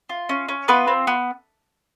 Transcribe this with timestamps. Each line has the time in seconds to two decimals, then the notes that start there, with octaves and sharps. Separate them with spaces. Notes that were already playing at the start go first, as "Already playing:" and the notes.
0.09 F4
0.29 C#4
0.49 C#4
0.68 B3 F4 B4
0.88 C4
1.07 B3